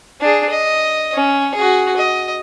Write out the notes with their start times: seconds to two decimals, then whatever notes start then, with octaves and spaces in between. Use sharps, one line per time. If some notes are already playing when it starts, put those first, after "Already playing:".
0.21 D4 G#4
0.50 D#5
1.14 C#4
1.55 F#4 G#4
1.97 D#5